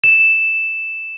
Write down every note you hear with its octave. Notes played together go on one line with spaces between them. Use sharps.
E7